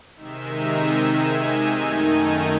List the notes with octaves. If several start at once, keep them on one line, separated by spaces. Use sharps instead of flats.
C3 D#3 G#3 D#4 E5
G#5
F#2 D#3 A3 D#4